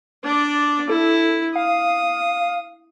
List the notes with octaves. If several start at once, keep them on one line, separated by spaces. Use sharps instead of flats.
D4 D5
E4 A4
F5 D#6